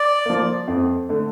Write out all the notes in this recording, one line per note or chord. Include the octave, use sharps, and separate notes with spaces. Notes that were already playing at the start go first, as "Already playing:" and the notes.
Already playing: D5
F3 A#3
F2
D3 A3